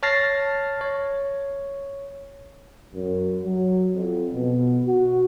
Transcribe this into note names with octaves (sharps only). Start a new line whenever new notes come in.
C#5 A5 F6 A6 A#6 C7
C#5
F#2
F#3
F2
B2
F#4